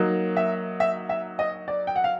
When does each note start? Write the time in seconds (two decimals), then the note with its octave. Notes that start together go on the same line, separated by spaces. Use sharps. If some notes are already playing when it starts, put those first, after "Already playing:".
Already playing: F#3 A#3 D#4
0.37 E5
0.80 E5
1.09 E5
1.39 D#5
1.68 D5
1.87 G5
1.96 F#5
2.04 F5